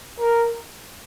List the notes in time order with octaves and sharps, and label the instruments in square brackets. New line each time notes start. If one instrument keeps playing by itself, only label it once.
[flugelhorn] A#4